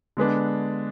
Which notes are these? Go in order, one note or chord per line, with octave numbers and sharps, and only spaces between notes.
D3 G#3 B3 D4